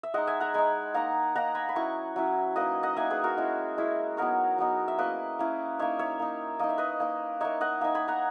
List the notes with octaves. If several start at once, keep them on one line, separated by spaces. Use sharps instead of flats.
E5
G#3 D#4 D#5 F#5
E5 G#5
F#5 A#5
G#3 D#4 G#5 B5
A#3 D#4 F#5 A#5
A#3 D#4 F#5 A#5
G#5 B5
B5
F#3 C#4 E4 A#5 C#6
F#3 C#4 E4
A#3 D#4 B4 D#5
D#5 F#5
A#3 D#4 E5 G#5
G#4 B4
F#4 A#4
G#3 C#4 E4
G#3 C#4 E4
F#3 B3 D#4 A#4 C#5
F#3 B3 D#4
E5
A#3 C#4 E4 B4 D#5
A#3 C#4 E4
A#3 D#4 C#5 E5
C#5 E5
A#3 D#4
A#3 D#4 D#5
E5
B4 D#5
A#3 D#4
A#3 D#4 C#5 E5
D#5 F#5
A#3 D#4 E5 G#5
G#5 B5
F#5 A#5